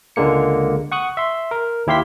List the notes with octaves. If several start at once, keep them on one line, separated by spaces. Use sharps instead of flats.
C#2 D3 G#3 A#3 C#7
F#5 C#6 D#6 F#6
E5 C6
A#4
D#2 E4 G4 F5 C6 B6